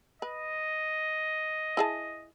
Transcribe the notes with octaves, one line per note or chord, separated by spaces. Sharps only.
B4 D#5
E4 G#4 A5